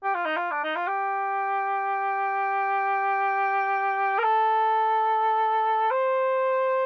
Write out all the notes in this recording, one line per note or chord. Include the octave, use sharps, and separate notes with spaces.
G4
F4
D#4
F4
D4
D#4
F4
G4
A#4
A4
C5